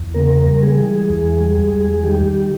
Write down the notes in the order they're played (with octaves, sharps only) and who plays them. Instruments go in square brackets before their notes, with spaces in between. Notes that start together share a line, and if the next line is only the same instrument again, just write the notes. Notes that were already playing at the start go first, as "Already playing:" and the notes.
Already playing: [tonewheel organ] E2
C#3 A#3 A#4
G3
G#3 G#4
E3
E2
G3
E2
D#3 G3 G4